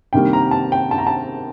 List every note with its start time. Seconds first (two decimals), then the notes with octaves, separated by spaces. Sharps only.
0.13 C3 D#3 G3 A#3 G5
0.33 A#5
0.51 A5
0.72 G5
0.91 A5
0.98 A#5
1.07 A5